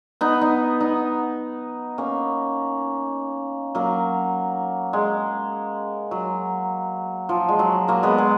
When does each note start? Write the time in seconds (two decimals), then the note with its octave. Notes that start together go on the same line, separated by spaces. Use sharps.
0.21 B3 D#4
0.41 B3 D#4
0.80 B3 D#4
1.98 A#3 C#4
3.75 F#3 A#3
4.93 G#3
6.11 F#3
7.29 F3
7.49 G#3
7.59 F#3
7.88 F#3 A#3
8.03 G#3 B3
8.18 G#3